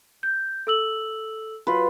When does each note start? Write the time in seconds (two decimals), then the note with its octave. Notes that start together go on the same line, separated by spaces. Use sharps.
0.23 G6
0.67 A4 E6 F#7
1.67 F#3 F4 B4